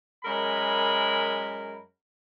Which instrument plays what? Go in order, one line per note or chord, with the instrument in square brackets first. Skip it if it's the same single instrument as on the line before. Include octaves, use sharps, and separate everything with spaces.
[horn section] F#2 G#3 A#4 B5